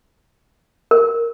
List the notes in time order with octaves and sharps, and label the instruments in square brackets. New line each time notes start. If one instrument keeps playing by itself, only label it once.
[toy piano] A#4